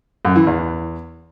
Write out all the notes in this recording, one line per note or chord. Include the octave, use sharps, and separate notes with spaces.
F#2
E3
E2